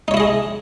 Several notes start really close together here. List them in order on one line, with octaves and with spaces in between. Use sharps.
D#4 C#5 E4 D#5 G#4